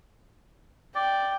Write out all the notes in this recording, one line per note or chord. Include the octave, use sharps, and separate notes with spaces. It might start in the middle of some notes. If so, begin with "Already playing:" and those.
D5 G5